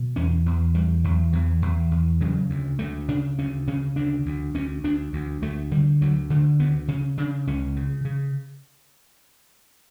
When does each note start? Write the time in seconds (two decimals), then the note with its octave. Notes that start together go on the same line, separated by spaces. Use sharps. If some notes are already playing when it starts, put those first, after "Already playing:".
Already playing: B2
0.16 E2 C#4
0.46 E2
0.75 E2 G3
1.04 E2 F#3
1.33 E2 E3
1.62 E2
1.91 E2
2.21 C#3 F#3
2.50 D2
2.79 D2 A3
3.09 C#3 D4
3.38 D2 C#4
3.67 C#3 C#4
3.96 D2 D4
4.26 D2
4.55 D2 C#4
4.84 D2 D4
5.13 D2
5.42 D2 A3
5.71 D3 G3
6.01 D2 F#3
6.30 D3 A3
6.59 D2 B3
6.88 C#3 C#4
7.18 C#3 D4
7.47 C#2 C#4
7.76 C#3
8.05 C#3